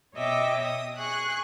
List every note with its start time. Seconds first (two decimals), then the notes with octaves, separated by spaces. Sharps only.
0.15 B2 C#5 D#5 E5 G5 D6
0.62 D#6
0.97 G#4 G#5 C#6 F#6